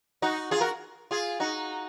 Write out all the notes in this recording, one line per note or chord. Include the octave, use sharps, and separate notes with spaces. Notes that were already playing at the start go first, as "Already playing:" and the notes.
D#4 F#4
F4 G#4
F#4 A#4
F4 G#4
D#4 F#4